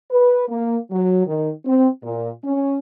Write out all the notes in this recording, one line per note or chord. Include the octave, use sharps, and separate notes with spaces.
B4
A#3
F#3
D#3
C4
A#2
C#4